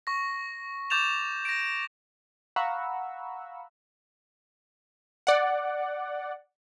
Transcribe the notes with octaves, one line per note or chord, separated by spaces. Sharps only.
C#6 A#6
C#6 D6 G6 A6 E7 F7
A#6 D7
F5 F#5 A#5 B5 C#6 E6
D5 F#5